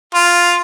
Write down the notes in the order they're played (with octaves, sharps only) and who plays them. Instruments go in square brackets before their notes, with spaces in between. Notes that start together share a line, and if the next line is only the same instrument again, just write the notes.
[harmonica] F4